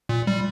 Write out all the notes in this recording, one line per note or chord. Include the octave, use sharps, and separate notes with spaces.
A#2
G3